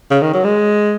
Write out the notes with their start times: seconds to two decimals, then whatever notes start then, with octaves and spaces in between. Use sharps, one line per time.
0.11 C#3
0.22 D#3
0.34 F#3
0.44 G#3